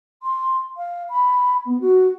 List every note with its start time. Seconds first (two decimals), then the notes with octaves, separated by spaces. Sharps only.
0.22 C6
0.76 F5
1.09 B5
1.65 B3
1.80 F#4